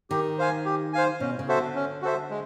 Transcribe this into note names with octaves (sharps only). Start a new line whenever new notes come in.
D#3 G4
C5 F5 G#5
G4
C5 F5 G#5
B2 C#4
C#3
F#4 A4 C5 E5
D3
C#4
F#4 A4 C5 E5
G#3